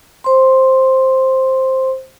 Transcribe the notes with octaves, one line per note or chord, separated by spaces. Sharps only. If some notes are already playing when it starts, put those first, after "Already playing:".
C5 C6